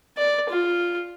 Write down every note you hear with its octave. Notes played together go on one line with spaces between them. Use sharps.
D5
F4